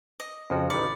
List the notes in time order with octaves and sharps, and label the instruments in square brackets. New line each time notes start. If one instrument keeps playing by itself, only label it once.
[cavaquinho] D#5
[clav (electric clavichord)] F2 F3 F#4 [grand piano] C#3 C4
[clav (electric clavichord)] A1 D#3 [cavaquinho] D5 [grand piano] B5 C#7